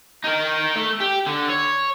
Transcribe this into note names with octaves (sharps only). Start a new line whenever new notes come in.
D#4 A#4
A3
G4
D3
C#5